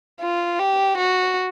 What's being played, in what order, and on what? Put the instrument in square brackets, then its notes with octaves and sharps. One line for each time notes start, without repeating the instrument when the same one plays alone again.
[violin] F4
G4
F#4